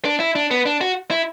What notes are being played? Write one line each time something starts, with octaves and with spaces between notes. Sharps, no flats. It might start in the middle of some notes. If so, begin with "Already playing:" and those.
D4
E4
D4
B3
D4
F#4
E4